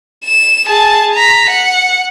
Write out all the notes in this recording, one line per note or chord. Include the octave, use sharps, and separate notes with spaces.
E7
G#4 A5
A#5 B6
F#5